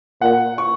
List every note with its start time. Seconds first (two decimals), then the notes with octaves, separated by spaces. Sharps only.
0.21 A#2 F#5
0.58 C#6